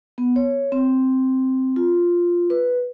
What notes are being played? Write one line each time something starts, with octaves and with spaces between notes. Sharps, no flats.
B3
C#5
C4
F4
B4